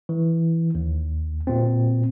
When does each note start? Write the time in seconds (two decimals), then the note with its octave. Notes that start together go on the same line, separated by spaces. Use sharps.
0.09 E3
0.75 D#2
1.47 A#2 C4